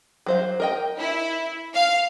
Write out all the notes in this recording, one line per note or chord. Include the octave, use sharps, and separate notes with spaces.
F#3 C5 F5
A#4 D#5 G5
E4
F5